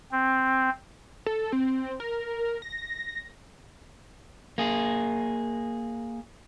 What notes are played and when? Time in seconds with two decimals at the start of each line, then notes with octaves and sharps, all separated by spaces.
0.12 C4
1.26 A4
1.52 C4
2.00 A#4
2.62 A#6
4.58 A#3 G#4